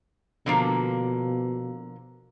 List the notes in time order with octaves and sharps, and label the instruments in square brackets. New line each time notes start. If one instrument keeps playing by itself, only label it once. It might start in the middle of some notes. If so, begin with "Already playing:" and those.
[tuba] B2 [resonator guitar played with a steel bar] D3 F3 A#3